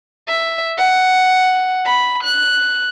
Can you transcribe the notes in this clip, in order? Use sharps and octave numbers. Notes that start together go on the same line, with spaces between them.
E5
F#5
B5
F#6